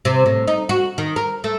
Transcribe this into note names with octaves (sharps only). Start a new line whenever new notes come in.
C3
A2
D#4
F#4
D#3
A#4
A3